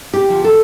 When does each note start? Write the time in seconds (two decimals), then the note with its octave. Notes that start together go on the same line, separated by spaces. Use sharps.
0.14 G4
0.29 D3 F3
0.44 A4